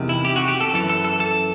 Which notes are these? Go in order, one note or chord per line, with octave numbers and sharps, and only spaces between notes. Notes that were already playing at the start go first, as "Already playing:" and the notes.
Already playing: E2 C3 D#3
E4
G4
F#4
G4
A4
F#2 E3 A4
A4
A4
A4